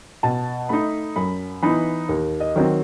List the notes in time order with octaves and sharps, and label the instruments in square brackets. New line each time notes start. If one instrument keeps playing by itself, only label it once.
[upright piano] B2 A5
A3 D#4 B5
F#2 B5
E3 B3 D#4 B5
D#2
D#5
D#3 F#3 C4